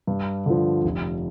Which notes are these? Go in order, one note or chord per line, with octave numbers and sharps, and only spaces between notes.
G2
D3 F3
F1